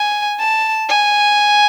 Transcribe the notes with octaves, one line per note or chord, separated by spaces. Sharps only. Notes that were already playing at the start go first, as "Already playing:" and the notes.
Already playing: G#5
A5
G#5